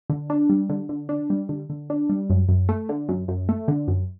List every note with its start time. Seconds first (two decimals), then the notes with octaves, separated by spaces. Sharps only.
0.10 D3
0.30 D4
0.50 G3
0.70 D3
0.89 D3
1.09 D4
1.30 G3
1.49 D3
1.70 D3
1.90 D4
2.09 G3
2.30 F#2
2.49 F#2
2.69 A3
2.89 D3
3.09 F#2
3.28 F#2
3.49 A3
3.68 D3
3.88 F#2